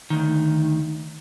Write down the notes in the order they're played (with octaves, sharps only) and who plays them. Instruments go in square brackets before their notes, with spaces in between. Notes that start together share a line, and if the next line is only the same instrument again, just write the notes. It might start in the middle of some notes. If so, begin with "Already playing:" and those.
[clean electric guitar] D2 D#3